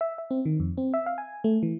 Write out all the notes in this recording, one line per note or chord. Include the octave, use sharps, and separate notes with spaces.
E5
E5
C4
D#3
F2
C4
E5
F5
G#5
A3
E3